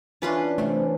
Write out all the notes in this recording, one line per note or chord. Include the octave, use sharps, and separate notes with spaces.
E3 C#4 D4 F4 B4 C6
C3 G3 A3 C4